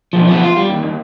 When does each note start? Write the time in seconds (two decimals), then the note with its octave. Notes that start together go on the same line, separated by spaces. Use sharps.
0.13 B1 F3
0.28 F3 B3
0.44 F4
0.57 G3
0.70 D#2
0.83 D#2